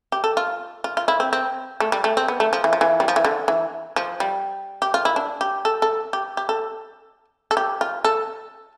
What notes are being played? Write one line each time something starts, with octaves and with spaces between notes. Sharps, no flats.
G4
A4
F4
F4
F4
E4
C4
C4
A3
G3
A3
C4
B3
A3
F3
E3
F3
E3
G3
F3
E3
D3
E3
F3
G3
G4
F4
E4
D4
G4
A4
A4
G4
G4
A4
A4
G4
F4
A4